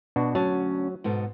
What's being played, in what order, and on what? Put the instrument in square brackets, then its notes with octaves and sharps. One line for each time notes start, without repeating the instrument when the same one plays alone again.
[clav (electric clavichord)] B2 D4 F#4
[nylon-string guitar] D2 C#4 A5 [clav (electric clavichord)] F#3
[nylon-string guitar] G#2 B2 A4